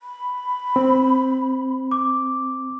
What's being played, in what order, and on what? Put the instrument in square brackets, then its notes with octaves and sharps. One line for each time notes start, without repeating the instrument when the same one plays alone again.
[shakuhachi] B5
[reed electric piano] C4
[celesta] D6